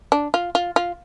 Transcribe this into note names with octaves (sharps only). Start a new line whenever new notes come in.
D4
F4
F4
F4